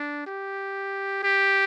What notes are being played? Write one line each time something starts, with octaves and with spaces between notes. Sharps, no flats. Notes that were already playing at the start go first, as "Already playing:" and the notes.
Already playing: D4
G4
G4